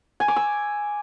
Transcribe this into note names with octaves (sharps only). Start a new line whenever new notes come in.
G#5
D6
E6